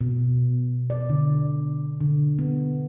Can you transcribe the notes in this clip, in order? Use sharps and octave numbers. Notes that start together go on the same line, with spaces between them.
B2
D5
D3
D3
B3